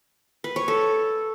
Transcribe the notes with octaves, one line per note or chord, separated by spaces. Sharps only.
B4
C#5
A4